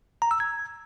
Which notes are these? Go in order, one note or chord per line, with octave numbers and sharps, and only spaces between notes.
A#5
E6
G#6